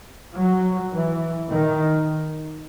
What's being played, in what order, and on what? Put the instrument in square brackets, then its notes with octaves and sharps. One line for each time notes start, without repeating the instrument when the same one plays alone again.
[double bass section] F#3
E3
D#3